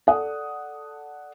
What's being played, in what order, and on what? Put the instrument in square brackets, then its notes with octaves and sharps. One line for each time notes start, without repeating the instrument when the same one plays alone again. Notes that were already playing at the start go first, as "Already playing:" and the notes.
[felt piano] A4 D5 F#5 D#6